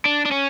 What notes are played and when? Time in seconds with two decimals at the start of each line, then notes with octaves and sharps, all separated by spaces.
0.05 D4
0.25 D4
0.31 C#4